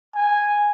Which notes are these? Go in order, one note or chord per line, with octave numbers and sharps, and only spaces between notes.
G#5